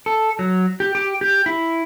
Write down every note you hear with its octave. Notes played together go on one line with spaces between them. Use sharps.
A4
F#3
G4
G4
G4
E4